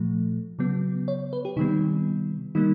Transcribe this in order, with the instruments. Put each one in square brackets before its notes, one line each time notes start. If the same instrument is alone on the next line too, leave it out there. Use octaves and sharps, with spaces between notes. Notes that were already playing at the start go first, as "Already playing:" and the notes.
Already playing: [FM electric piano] A#2 F3 A3
C#3 F#3 B3
C#5
B4
G4
C3 D#3 G3 B3 D#4
D#3 G3 A#3 D#4